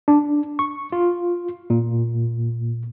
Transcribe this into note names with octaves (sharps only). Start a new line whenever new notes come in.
D4
C#6
F4
A#2